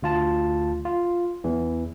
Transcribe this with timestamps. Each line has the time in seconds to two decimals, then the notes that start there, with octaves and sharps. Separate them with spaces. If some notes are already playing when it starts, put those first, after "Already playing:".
0.03 D2 F4 A5
0.85 F4
1.44 E2 E3